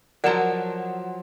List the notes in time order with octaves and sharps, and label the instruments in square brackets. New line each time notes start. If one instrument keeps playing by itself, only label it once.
[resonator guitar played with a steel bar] F3 F#3 [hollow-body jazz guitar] A#4 A5 A#5 [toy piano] D5 [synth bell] F#5